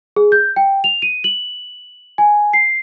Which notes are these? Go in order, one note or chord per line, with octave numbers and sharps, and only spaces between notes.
G#4
G6
G5
F7
D#7
F#7
G#5
C7